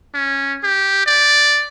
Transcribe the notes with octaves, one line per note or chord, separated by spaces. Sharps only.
C#4
G4
D5